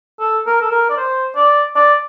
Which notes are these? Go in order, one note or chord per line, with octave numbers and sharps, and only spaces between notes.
A4
A#4
A4
A#4
D5
C5
D5
D5